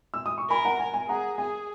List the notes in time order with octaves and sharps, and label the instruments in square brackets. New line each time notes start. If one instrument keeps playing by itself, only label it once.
[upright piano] E6
D#6
C#6
[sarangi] A#4 [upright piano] G#5 B5
[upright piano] F#5 A#5
[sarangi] A#4 [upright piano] G#5
[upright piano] G#5
[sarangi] G#4 [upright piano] F#5 A#5
[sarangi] G#4 [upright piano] G#5